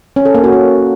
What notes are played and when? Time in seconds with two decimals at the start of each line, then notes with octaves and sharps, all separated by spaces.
0.16 C#4
0.25 A4
0.35 A#3
0.44 F#4
0.53 A#3